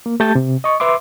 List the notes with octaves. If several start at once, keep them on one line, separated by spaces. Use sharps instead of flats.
A#3
A3 G4 A5 G6 A6
C3
D#5 C#6
B4 E5 C6 D6